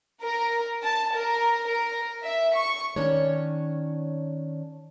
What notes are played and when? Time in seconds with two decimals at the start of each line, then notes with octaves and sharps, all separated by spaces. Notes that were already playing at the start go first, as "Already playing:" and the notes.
0.23 A#4
0.83 A5
1.16 A#4
1.67 A#4
2.24 E5
2.55 C#6
2.96 D#3 C#4 D4 C#5